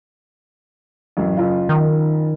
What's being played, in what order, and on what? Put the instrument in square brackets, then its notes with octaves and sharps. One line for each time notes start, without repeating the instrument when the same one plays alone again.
[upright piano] A1 F#2
F#1 F4
[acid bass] D#3